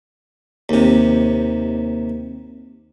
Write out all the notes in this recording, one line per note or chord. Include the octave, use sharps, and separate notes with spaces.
D#2 C3